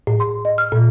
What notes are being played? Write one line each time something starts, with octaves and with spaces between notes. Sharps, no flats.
A2
C6
D#5
F6
A#2